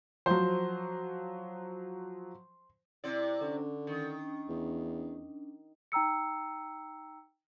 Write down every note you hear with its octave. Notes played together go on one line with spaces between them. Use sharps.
F3 F#3 C5
C3 C4 E4 D5
D3 C#4 D4
D#3
E2
D#4 G5 A#5 E6 C#7